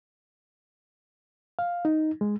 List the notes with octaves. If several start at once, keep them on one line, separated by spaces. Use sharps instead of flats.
F5
D#4
G#3